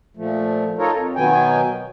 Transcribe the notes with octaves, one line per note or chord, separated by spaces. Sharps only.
A#2 F3 A3
D#4 F4 A4 A#4 C#5
F2
B2 D#3 F#3 B3 G5 G#5